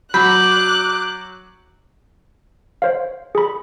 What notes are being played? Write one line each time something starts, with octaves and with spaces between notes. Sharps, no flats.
F#3 F#4 B5 D6 F#6 G6
C5 C#5 F5
G#4 B5